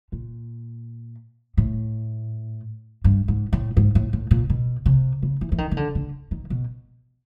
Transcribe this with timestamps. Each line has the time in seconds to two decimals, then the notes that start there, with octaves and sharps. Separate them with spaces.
0.12 A#2
1.57 A2
3.04 G2
3.28 G#2
3.53 A2
3.77 G#2
3.95 A2
4.13 A2
4.31 A#2
4.50 B2
4.86 C3
5.22 C#3
5.41 E3
5.52 E3
5.58 D#3
5.71 D#3
5.77 D3
5.95 D3
6.31 D#3
6.50 B2